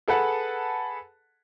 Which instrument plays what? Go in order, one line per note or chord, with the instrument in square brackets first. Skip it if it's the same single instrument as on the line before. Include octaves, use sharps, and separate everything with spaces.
[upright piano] G#4 A4 B4 F#5 A5